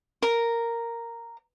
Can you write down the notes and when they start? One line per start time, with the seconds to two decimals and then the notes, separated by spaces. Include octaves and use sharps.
0.22 A#4